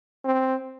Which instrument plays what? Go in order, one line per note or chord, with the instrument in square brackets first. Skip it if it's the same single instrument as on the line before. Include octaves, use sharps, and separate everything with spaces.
[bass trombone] C4